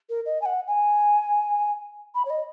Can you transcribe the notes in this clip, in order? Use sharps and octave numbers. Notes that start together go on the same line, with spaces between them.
A#4
D#5
G#5
F#5
G#5
B5
C#5
D#5